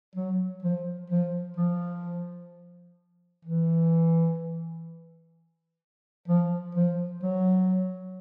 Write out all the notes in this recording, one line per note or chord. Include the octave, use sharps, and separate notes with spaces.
F#3
F3
F3
F3
E3
F3
F3
F#3